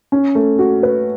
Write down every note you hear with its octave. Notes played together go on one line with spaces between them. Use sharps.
C#4
A3
F#4
B4